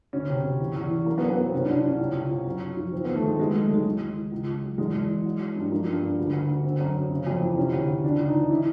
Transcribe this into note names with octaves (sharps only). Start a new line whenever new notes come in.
D2 C#4
C3
C3
E2
E2
E3
F#3 A#3
B3
F#2
B3
F#3 C4
C2 C#4
D4
C2
D4
C2 C#4
C#2
C#2
C3
F#2
F#2
F3
D#2 C4
D#2 B3
A3
D#2 G#3
D#2 G#3
A3
F#3
A3
D#2 G#3
E3 G#3
E3
E3
C#2
C#2
F#3
E2 G#3
E2
E3
F#3
F#3
G2
F3 A#3
G2
G2
D2
D2
D2
D3 C4
F#2
F#2
C#3
F2
E3
C3 C#4
D2
D2
C#2 D4
C#2
D#4
E3
E4